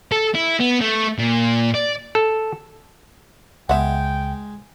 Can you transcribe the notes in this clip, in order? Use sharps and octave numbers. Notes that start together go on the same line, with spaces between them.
A4
E4
B3
A3
A#2
D5
A4
C#2 G#3 B3 E5 F#5 G5